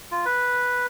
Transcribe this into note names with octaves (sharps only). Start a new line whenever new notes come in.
F4
B4